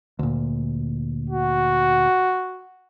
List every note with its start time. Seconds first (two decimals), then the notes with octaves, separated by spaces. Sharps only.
0.19 D2 A#2
1.30 F#4